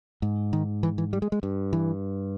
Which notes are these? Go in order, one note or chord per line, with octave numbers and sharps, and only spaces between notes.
G#2
D#3
E3
E3
G3
G#3
G#3
G2
E3